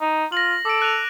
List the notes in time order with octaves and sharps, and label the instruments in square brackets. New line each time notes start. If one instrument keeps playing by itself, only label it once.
[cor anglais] D#4
[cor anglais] F4 [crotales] A#6 F#7
[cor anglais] A4 [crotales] D6 D7
[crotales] F#6 D#7 F7